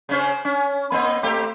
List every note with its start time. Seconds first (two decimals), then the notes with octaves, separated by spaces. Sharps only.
0.09 C#3 C#4 C5
0.45 C#4
0.92 A#3 C4 D#5
1.23 A3 C4 G4